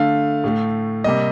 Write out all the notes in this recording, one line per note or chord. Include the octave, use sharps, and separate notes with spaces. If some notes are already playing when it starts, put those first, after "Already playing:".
Already playing: D3 A3 F5
A2 A3
C3 G3 A#3 D#5